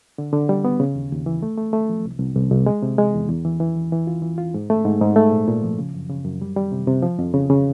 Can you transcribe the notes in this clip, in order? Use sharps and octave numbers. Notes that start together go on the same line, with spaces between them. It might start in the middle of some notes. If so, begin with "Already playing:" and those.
D3
D3
G3
B3
C#3
D#2
D#2
E3
A3
A3
A3
F3
C2
C2
C2
C2
G#3
C3
G#3
E2
E2
E3
E3
E2
E3
F4
E3
F4
G#2
A3
G#2
G#2
A3
A#2
A#2
F3
C#3
F#2
C#3
F#2
G3
G3
C3
C3
F3
F2
C#3
C#3